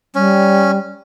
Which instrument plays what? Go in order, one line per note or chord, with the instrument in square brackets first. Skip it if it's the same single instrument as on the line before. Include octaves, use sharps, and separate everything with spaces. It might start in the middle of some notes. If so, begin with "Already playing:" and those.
[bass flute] G3 [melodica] C#4